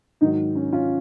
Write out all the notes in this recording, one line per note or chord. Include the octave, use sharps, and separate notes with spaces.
G#2 D#3 F#3 D#4
C#4
C#4 F4